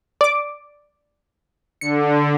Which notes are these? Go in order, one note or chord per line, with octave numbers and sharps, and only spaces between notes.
D5 D6
D3 C#7